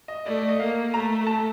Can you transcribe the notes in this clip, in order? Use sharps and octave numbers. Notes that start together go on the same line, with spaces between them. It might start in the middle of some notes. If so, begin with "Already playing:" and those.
D#5
A3 D5
D5
D#5
A#3 F5
A3 A#5
A5